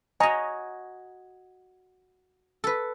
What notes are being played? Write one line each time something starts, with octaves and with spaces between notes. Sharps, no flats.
F#4 C#5 D#5 G#5 A#5
A4 B4